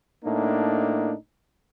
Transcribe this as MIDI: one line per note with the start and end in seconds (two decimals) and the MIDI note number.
0.24 1.13 45
0.24 1.13 58
0.24 1.13 62
0.24 1.13 63